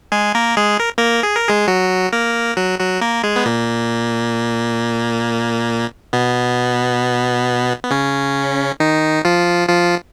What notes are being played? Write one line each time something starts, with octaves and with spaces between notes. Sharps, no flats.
G#3 G#4
A#3 A#4
G#3 G#4
A#4
A#3 A#4
G#4
A#4
G#3 G#4
F#3 F#4
A#3 A#4
F#3 F#4
F#3 F#4
A#3 A#4
G#3 G#4
B3
A#2 A#3
B2 B3
B3
C#3 C#4
D#3 D#4
F3 F4
F3 F4